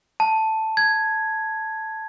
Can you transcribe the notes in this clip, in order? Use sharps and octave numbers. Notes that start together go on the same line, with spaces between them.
A5
G#6